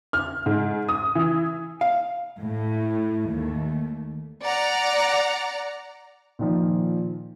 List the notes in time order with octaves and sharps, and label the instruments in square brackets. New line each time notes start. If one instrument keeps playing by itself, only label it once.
[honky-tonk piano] F6
G#2
D#6
E3
[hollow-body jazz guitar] F5
[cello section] A2
D#2 A3
[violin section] D5 F#5 A#5
[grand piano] A#2 D#3 F3